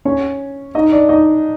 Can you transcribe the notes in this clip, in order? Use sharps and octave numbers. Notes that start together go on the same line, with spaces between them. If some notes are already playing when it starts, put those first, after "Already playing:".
C#4 C#5
D#4 D#5
D4 D5
D#4 D#5